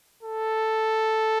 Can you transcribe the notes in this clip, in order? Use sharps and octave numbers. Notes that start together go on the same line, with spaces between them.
A4